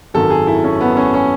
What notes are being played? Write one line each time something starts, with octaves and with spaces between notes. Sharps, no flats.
G#1 F#2 D#3 F#3 A4
G#4
E4
C#4
B3
C#4
C#4